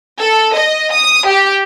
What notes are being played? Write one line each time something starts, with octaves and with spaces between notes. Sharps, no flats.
A4
D#5
D#6
G4